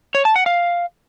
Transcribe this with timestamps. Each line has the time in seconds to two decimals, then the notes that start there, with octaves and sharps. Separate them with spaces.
0.15 C#5
0.25 A5
0.36 F#5
0.46 F5